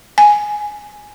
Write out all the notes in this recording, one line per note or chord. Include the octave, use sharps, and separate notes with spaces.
G#5